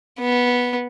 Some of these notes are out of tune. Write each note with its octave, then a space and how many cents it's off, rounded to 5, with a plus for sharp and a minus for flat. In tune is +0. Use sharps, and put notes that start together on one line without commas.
B3 -10